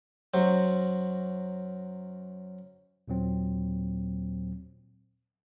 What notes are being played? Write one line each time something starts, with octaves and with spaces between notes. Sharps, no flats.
F#2 F#3 C5
D#2 A#2 F#3 C4